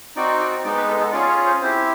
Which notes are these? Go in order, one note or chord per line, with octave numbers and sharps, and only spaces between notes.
C4 D#4 F#4 D5
D5
G#3 B3 D#4 D5
B4
A4
A4
C#4 F4 G#4 D5
C#5
C5
C4 E4 G4 C5